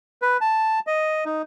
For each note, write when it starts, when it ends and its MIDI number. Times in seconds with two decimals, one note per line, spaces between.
0.22 0.37 71
0.41 0.79 81
0.87 1.24 75
1.26 1.42 63